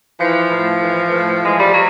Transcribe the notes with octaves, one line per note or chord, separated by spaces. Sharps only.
E3 F3
A2
E3
A2
E3 G#3
G3
F#3